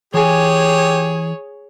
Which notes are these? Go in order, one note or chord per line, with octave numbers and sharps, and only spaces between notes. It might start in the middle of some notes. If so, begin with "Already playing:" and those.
E3 G4 G#4 C#5 G#5